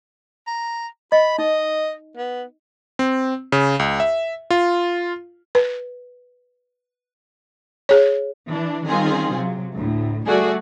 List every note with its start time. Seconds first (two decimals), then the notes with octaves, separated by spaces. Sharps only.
0.47 A#5
1.12 D#5 B5
1.38 D#4 D#5
2.17 B3
2.99 C4
3.52 C#3
3.79 C#2
4.00 E5
4.50 F4
5.55 B4
7.89 G#4 C#5
8.51 E3 D4
8.88 D#3 G3 C4 C#4 F4 G#4
9.36 C3 F#3
9.75 D2 A2
10.26 G3 A3 F#4 G#4 D5